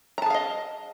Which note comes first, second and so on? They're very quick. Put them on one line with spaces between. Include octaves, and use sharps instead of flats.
A#5 A5 G#4 F5 D#5